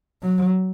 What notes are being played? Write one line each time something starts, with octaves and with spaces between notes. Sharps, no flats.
F#3